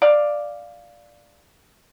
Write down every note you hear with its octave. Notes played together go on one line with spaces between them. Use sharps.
D5 F5